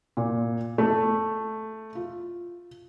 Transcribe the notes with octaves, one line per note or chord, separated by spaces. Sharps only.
A#2
A3
F4